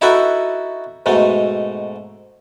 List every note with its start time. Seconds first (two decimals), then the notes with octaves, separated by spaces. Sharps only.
0.01 D#4 E4 F#4 A4 B4 E5
1.06 G#2 B2 A3